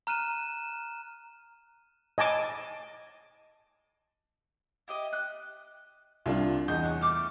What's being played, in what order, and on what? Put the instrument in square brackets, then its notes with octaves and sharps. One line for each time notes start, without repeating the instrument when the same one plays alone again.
[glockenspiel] A#5 F6 F#6 D#7 E7
[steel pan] D#5 G#5 A5 D6
[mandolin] E4 G4 D#5
F#6
[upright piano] C2 D4 F4
[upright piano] E2 G6 [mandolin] D#5
[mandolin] C#5 F#5
A3 D6 F6